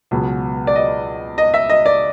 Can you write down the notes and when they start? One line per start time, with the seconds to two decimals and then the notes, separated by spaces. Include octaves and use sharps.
0.11 C#2 B2 F#3 B3
0.67 D5
0.75 D#5
1.38 D#5
1.54 E5
1.69 D#5
1.86 D5